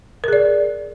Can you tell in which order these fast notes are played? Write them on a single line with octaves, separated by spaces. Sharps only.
A#4 G#4 D5